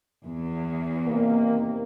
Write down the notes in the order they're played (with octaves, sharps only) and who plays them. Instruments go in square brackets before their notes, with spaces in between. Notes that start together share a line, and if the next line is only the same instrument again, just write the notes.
[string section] E2
[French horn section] C3 D#3 A#3